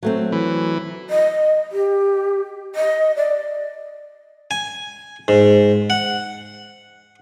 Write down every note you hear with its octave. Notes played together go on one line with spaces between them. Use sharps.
F#3 A3 C4
E3
D#5
G4
D#5
D5
G#5
G#2
F#5